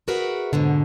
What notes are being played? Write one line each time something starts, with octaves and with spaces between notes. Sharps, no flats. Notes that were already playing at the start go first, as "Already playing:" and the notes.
F#4 G#4 A#4 B4 E5 F#5
F2 G#2 B2 D3